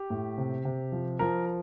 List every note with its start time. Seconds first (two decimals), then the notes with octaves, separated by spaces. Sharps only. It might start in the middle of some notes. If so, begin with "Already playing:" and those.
Already playing: G4
0.10 A2
0.38 C3
0.65 C3
0.92 F3
1.19 F3 A#4